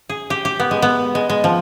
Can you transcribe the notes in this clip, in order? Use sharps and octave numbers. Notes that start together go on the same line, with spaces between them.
G#4
G4
G4
B3
G#3
B3
G#3
G#3
F3